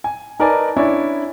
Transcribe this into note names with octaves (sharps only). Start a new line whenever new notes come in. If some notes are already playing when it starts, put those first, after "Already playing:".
G#5
D#4 A#4 B4 D5 G#5 A5
C#4 D4 E4 C#5 D5